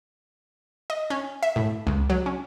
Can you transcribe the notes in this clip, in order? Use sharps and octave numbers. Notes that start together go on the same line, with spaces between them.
D#5
C#4
E5
A2
C#2
F#3
C#4